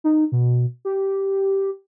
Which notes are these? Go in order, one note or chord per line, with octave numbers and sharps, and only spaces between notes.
D#4
B2
G4